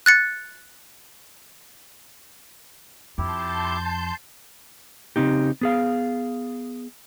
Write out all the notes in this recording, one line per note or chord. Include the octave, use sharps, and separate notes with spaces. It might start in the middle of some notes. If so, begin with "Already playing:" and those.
F#6 A6 C#7
F2 E4 G4 A5 C6 G6
C#3 C4 D#4 G4
B3 G#4 F5